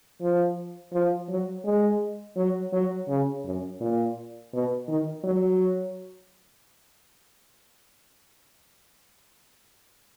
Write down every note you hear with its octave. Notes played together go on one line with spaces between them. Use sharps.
F3
F3
F#3
G#3
F#3
F#3
C#3
F#2
A#2
B2
D#3
F#3